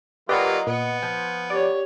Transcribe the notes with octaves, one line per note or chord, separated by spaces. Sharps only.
F#3 A#3 F4 G4 B4 D5 D#5 F#5
A#2 B3 C#7
F3
G4 C#5 D5